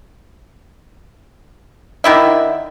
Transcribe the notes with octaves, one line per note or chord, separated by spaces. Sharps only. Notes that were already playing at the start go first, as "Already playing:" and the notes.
D3 D#3 E4 E5